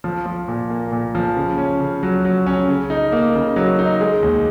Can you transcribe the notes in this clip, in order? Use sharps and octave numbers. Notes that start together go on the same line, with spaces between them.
F3
F3
A#2
A#3
A#2
F3
C#3
C#4
C#3
F#3
F#3
C#4
C#3
D#4
A#3
C#3
F#3
D#4
G#3
D#2